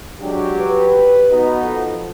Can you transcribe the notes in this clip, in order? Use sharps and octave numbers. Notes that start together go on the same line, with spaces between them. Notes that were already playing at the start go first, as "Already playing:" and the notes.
F#3 G#3 D4 G4
B4
B3 D#4 F#4
F3 A4